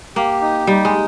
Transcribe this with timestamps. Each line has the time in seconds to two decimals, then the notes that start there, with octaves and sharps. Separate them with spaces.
0.16 A#3 G4
0.41 D#4
0.67 G3 D#4
0.85 G#3